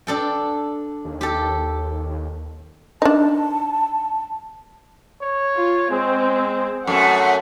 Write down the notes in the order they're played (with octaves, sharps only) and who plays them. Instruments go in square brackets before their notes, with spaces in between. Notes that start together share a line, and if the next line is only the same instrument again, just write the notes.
[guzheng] D4 A4 G5
[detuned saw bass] D#2
[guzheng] G4 A4
[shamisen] D4 D#4 [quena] A5
[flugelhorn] C#5
[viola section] F4
[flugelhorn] G#3 [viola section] C4
[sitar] F#2 A3 [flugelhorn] A4 [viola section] F#5